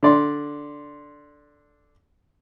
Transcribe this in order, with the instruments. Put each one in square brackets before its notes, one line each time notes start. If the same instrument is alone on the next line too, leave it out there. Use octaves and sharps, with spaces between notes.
[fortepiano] D3 D5 C6